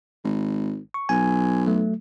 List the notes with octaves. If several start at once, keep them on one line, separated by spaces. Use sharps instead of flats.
G#1
C#6
B1 G#5
F#3 A3